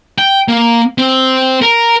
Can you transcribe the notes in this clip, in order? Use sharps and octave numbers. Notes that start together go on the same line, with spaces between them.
G5
A#3
C4
A#4